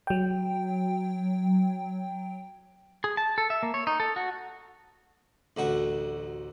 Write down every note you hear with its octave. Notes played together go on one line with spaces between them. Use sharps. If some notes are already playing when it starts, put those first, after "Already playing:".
F#3 G5
G#4
A5
A4
E5
A#3
C#5
D#4
A4
F#4
A1 D2 F#4